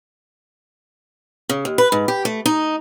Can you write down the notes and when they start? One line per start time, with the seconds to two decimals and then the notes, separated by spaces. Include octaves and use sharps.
1.49 C#3
1.65 D#2
1.78 B4
1.92 G#2
2.08 G4
2.25 A3
2.46 D#4